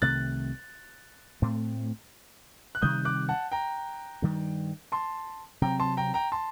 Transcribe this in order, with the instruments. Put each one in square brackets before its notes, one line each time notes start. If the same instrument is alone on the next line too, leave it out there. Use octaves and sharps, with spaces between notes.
[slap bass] C2 C3 D#3 A3 [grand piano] F#6 A6
[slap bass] A2 A3 C4
[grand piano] F#6
[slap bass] C3 D#3 G3 [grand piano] D#6 G6
[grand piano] D6 F#6
F#5 A5
G5 A#5
[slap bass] G2 D#3 G3
[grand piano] A5 C6
[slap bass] C3 F#3 C4 [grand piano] G5 A#5
[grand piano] A5 C6
G5 A#5
G5 A#5
A5 C6